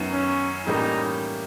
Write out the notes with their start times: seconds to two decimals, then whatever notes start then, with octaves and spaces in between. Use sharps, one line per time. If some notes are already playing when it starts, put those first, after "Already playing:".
Already playing: F#2 D#3 F#3 B3
0.12 C#4
0.66 A2 E3 G3 A#3 C#4 D#4